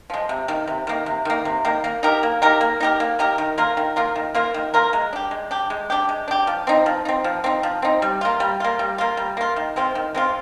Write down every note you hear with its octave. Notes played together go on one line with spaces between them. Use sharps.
F3 G#3
C3
D#3 A#3
C3
D#3 A#3
C3
D#3 A#3
C3
D#3 A#3
A#3
D#4 G4 A#4
A#3
D#4 G4 A#4
A#3
D#4 G4 A#4
A#3
D#4 G4 A#4
D#3
A#3 F4 A#4
D#3
A#3 F4 A#4
D#3
A#3 F4 A#4
D#3
A#3 F4 A#4
G#3
D4 G4
G#3
D4 G4
G#3
D4 G4
G#3
D4 G4
F3
C4 D#4
F3
C4 D#4
F3
C4 D#4
F3
C4 D#4
G3
A#3 F4
G3
A#3 F4
G3
A#3 F4
G3
A#3 F4
D#3
G#3 C4 F4
D#3
G#3 C4 F4